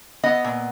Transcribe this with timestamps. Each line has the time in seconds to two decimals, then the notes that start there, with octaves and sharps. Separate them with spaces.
0.23 B3 D#5
0.44 A#2